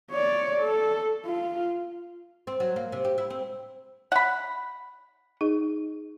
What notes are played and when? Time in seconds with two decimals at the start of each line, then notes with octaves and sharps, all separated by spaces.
0.11 C#5 D5
0.61 A4
1.26 F4
2.47 C4
2.60 F#3
2.76 A#3
2.92 C3
3.05 G4
3.18 E4
3.30 C4
4.12 F#5 B5
5.41 D#4 G#4 D#5